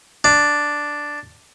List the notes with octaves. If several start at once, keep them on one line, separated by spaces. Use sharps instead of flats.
D4